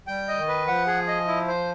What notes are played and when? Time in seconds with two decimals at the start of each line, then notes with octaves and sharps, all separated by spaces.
0.07 G3 G5
0.28 D#5
0.38 D#3
0.48 B4
0.67 F3 F#5
0.87 G#4
1.08 D#5
1.27 E4
1.48 C5